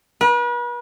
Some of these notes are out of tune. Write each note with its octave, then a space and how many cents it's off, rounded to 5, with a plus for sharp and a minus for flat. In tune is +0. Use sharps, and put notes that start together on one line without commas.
B4 -40